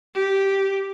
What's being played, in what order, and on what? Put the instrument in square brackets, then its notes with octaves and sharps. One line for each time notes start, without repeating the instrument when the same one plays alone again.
[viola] G4